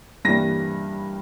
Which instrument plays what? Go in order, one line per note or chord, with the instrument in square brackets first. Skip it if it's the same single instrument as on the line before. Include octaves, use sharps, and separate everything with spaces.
[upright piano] G2 E3 G3 A#3 A#6